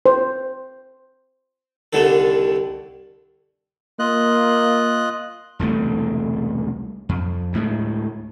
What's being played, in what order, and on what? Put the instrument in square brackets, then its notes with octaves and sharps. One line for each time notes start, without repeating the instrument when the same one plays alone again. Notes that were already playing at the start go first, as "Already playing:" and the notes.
[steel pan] C5
[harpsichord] C2 D3 D#3 A4
[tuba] A#3 [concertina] F4 D#5 F#6
[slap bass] E1 C2 D3 A3
F2
D2 A2 G#3